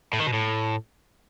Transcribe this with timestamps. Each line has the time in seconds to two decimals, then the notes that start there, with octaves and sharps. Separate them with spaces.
0.13 A2
0.20 D#3
0.26 B2
0.33 A2